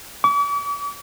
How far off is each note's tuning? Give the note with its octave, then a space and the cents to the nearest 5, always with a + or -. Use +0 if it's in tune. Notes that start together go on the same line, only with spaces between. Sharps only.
D6 -45